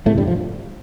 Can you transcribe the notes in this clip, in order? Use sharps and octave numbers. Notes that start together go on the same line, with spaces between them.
E1 E2 A2 C3 A3
G2 G3
F3